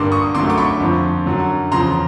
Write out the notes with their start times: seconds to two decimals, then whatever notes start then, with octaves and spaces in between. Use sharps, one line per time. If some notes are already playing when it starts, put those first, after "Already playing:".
Already playing: G2 D3 G3 A#3 C6 D6
0.12 C#6 D#6
0.35 F#2 D3 F#3 A3 C6 D6
0.50 D6
0.57 B5 C#6
0.81 F2 D3 F3
1.26 F#2 D3 F#3
1.72 E2 C#3 F3 A#5 C6